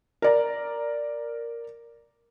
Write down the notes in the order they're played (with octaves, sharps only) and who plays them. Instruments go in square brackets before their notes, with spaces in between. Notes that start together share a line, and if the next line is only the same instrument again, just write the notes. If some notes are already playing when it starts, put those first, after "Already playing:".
[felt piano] A#4 D5 A#5